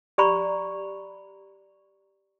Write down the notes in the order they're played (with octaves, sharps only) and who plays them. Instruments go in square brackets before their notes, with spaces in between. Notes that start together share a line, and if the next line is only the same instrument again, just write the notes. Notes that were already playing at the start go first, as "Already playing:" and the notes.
[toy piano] G4 D5 A#5 B5 C#6